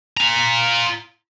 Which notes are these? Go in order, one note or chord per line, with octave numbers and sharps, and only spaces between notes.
F4 A#5